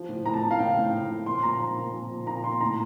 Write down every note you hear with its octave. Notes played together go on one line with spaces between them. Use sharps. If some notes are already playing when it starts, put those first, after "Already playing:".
Already playing: F3
A2
A2 A#5
A5
A2
F5
A2 G5
A2
A2
F3
A#2 C6
A#2 A#5
F3
A#2
F3
A#2
A#2 A#5
A#2 C6
A2 A#5